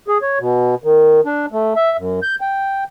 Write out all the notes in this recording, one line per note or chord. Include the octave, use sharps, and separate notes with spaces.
G#4
C#5
B2
D#3
D4
A3
E5
F#2
G6
G5